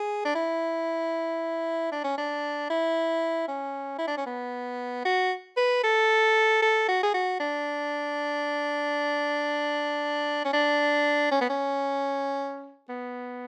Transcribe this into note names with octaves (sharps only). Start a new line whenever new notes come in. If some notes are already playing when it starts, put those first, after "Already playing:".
Already playing: G#4
D4
E4
D4
C#4
D4
E4
C#4
E4
D4
C#4
B3
F#4
B4
A4
A4
F#4
G#4
F#4
D4
C#4
D4
C#4
B3
C#4
B3